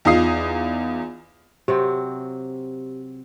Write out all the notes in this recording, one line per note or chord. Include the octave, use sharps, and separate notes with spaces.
E2 D#4 F4 D#6 C7
C3 F#3 C4 G4